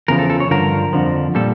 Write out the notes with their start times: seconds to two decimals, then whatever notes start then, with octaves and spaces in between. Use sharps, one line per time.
0.08 E2 C#3 F3 A#4
0.19 A4
0.30 A4
0.40 C#5
0.51 G2 D3 F3 A#4
0.93 F2 D3 F3
1.35 A#2 G3 A4